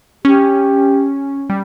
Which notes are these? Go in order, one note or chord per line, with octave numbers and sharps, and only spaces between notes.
C#4 G4
G3